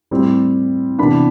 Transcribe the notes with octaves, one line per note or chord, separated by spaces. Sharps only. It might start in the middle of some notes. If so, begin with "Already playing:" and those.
A2 G3 C4
C3 E3 B3 D4 B5